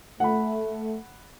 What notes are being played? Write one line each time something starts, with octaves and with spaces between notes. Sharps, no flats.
A3 F#5 B5